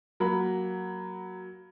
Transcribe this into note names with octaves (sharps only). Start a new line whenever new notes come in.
F#3 A#3 B5